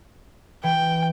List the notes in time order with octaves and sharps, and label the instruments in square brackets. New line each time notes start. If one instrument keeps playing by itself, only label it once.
[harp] E3 [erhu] G5